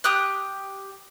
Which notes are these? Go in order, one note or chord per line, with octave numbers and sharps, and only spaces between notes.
G4 D#6 F#6